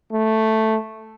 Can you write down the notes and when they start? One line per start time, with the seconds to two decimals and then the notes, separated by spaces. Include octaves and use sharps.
0.12 A3